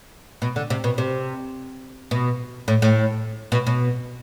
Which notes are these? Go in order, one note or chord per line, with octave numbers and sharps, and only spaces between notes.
B2
D3
C3
B2
C3
B2
A2
A2
B2
B2